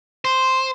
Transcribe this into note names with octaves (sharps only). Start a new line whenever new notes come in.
C5